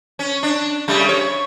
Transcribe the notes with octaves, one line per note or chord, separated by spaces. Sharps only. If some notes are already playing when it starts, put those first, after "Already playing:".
C#4
D4
C#3 G3 A3
C#5